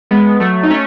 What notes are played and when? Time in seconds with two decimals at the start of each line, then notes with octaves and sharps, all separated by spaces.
0.11 G#3 B3
0.40 F#3 A3
0.63 D#4
0.70 A3 C#4